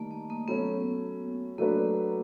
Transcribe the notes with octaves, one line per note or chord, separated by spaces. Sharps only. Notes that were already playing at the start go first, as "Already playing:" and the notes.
Already playing: D#3 G3 A3 A#3
A#3
A#3
F#3 A3 B3 C#4
F#3 A3 A#3 D4 F#4 B4